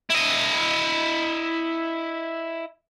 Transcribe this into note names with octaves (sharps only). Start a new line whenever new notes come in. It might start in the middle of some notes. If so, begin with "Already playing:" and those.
E4 D#5